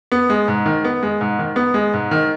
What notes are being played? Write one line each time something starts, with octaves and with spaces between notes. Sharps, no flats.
B3
G#3
G#2
D#3
B3
G#3
G#2
D#3
B3
G#3
G#2
D#3